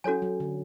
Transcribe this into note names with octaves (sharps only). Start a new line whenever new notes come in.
F#3 C#4 F#4 A4 C#5 G#5
F#3
D3